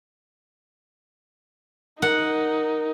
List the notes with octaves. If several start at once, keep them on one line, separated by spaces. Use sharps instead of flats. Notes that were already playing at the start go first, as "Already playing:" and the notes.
D#4 A#4 F#5